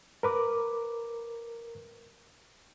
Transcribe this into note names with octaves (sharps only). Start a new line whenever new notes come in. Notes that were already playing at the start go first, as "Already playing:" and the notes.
A#4 B4 D6